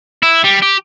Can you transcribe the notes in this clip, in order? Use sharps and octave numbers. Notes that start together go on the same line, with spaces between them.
E4
G3
G4